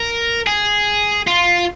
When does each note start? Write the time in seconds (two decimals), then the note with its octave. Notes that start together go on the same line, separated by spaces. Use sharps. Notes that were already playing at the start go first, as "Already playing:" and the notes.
Already playing: A#4
0.47 G#4
1.28 F4